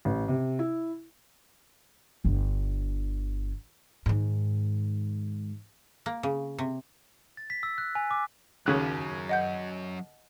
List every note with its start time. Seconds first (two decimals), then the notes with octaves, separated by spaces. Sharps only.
0.05 A1
0.28 C3
0.59 E4
2.25 G1 D3
4.06 G#2 D#3
6.06 A#3
6.23 C#3
6.58 C3
7.37 A6
7.50 B6
7.63 E6
7.78 F#6
7.95 G#5
8.11 D6
8.66 D#2 C#3 F#3 C#4 F#6
9.29 D#5 F#5 G6